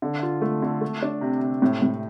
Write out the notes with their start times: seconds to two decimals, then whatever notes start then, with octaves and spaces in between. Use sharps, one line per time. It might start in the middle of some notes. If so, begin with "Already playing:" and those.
0.02 D3
0.23 F4
0.41 A3
0.62 D3
0.81 A3
1.02 D4
1.21 C3
1.41 C3
1.62 A2
1.82 A2